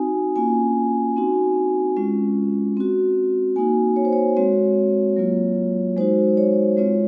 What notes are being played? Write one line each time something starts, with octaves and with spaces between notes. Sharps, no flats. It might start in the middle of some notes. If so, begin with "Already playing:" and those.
Already playing: C4 D#4 F#4 G#5
A#3 C#4 F4 G#5
C4 D#4 F#4
G#3 C#4 F4
C4 F#4
A#3 D#4 F#4 G#5
C#5
C5
C#5
G#3 C4 F#4 C#5
F#3 A#3 F4
G#3 D#4 F#4 C5
C#5
G#3 C4 F4 C#5